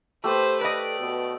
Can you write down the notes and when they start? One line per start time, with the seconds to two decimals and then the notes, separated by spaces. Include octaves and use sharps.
0.24 A3 G4 B4 C5
0.61 A4 B4 D5 D#5
1.00 B2